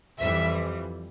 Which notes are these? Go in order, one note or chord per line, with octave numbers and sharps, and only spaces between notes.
F2 E3 G3 E5